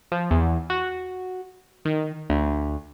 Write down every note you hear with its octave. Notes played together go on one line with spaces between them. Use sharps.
F3
E2
F#4
D#3
D2